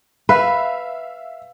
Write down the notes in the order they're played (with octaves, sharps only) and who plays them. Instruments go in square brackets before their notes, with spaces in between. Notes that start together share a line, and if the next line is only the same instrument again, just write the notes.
[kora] B4 [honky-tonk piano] E5 F5